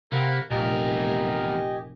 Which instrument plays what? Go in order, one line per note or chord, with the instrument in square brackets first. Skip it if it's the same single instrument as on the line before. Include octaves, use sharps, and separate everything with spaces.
[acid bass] C3 [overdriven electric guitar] A#3 [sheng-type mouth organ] A#4 F#5 B5
[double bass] F1 A3 [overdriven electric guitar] E2 A#4 [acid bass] A#2 [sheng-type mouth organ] G4 D#5 G#5